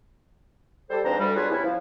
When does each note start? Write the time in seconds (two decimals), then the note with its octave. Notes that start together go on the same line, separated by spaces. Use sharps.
0.90 G3 A4 C5
1.04 F2 G#2 D4 B4 C5 A#5
1.19 D2 G3
1.35 F#3 B3 D4 F4 G#4 B4
1.50 C3 B3 C#4 E4
1.64 F3